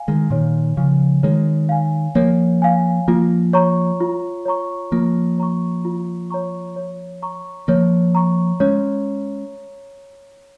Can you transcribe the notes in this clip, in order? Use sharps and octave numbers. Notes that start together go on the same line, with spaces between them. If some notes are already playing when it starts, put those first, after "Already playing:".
Already playing: F5 G#5
D#3 G#3
A#2 D#3 C#5
C#3 F3 F5 G#5
D#3 G#3 C#5
F5 G#5
F3 A#3 C#5
F5 G#5
F3 A#3 F4
C#5 A#5 C#6
F4
C#5 A#5 C#6
F3 A#3 F4
C#5 A#5 C#6
F4
C#5 A#5 C#6
C#5
A#5 C#6
F3 A#3 C#5
A#5 C#6
G#3 C#4 C#5